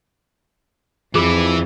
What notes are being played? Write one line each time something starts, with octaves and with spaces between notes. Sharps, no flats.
F2 E3 E4 F4 G#4 D6